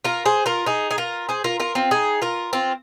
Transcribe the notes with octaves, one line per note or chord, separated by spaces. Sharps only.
F4 A#4
G#4 C5
F4 A#4
D#4 G#4
G#4
F4 A#4
G#4 C5
F4 A#4
F4 A#4
C4 F4
D#4 G#4
F4 A#4
C4 F4